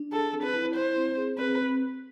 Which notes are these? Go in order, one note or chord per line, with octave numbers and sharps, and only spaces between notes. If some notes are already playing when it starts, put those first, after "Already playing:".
Already playing: D4
G#4 A4
C4
B4
E4
E4 C5
C4
G#4
C4 B4
C4